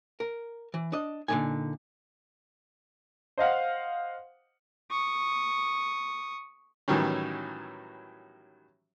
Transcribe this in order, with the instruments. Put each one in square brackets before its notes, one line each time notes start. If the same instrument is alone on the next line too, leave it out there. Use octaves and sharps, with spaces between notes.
[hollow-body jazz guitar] A#4
E3
D4 D#5
A#2 D3 E3 A#3 D#4 G#5
[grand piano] C5 D#5 F5 F#5
[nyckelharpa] C#6 D#6
[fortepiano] A2 D#3 E3 F#3 G3 C#4